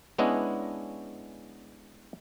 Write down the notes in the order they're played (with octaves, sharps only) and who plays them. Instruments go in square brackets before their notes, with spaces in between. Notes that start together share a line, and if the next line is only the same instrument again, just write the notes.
[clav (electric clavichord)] G#3 B3 C#4 D4 E4 D#5